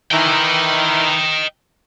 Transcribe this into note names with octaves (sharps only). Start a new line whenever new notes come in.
D#3 E3 D#5 G5